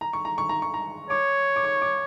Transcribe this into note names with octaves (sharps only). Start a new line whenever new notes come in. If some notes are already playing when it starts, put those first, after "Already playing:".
A#5
C#6
A#5
C#6
A#5
C#6
A#5
C#5 D6
D6
C#6
D6